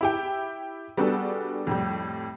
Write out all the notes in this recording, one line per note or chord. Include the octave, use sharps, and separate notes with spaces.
E4 G4 G5
G3 B3 D4 F#4 G#4 A4
F2 A2 G3